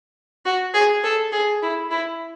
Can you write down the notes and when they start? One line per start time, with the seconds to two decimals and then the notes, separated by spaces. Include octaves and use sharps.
0.45 F#4
0.74 G#4
1.04 A4
1.32 G#4
1.62 E4
1.91 E4